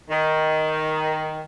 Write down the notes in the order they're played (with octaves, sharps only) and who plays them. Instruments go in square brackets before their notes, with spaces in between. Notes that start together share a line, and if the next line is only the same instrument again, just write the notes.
[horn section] D#3